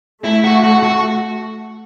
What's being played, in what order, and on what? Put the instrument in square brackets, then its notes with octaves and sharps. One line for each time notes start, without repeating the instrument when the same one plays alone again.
[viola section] A3 [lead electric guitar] E4
[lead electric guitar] F#4
F#4
F#4